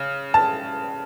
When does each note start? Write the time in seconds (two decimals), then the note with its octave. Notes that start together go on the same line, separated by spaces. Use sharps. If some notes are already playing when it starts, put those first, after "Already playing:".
Already playing: C#3
0.34 A5